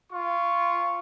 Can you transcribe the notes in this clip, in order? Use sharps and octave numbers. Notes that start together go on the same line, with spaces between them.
F4 C#6